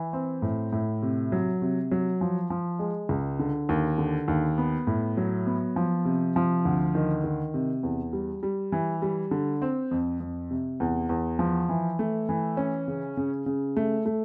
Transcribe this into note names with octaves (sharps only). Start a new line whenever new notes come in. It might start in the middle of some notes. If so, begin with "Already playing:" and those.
Already playing: E3
C4
A2
A2
C3
F#3
C3
F#3
F3
F3
G#3
C#2
D3
D#2
D3
D#2
B3
A2
F#3
B3
F3
C3
F3
D2
D#3
D#3
C3
E2
G3
G3
E3
G3
D3
C4
F2
F2
C3
E2
E2
F3
E3
A3
E3
C#4
C#3
C#3
C#3
A3
A3